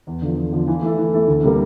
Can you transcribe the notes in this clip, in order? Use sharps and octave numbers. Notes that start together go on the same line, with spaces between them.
E2
D3 F3
E2
D3 F3
E3
A3 E4 A4
E3
A3 E4 A4
D2
C3 G3 A#3